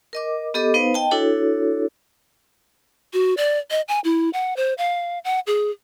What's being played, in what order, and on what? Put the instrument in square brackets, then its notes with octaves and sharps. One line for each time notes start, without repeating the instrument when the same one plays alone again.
[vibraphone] A#4 D#5 D6
B3 G4 A4 D#5 D6
B3 D#4 B4 C5 F5
D#5 G5 A5
D4 E4 F#4 A4 C#5
[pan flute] F#4
D5
D#5
G#5
E4
F#5
C5
F5
F#5
G#4